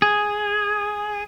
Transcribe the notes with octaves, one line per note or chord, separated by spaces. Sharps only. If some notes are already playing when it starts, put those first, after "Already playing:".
G#4